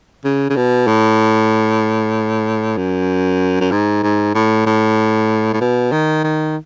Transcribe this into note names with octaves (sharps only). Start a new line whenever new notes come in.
C#3
C#3
B2
A2
F#2
F#2
G#2
G#2
A2
A2
A2
B2
D#3
D#3